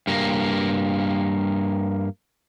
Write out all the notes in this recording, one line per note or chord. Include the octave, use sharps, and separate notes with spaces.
G2 A#3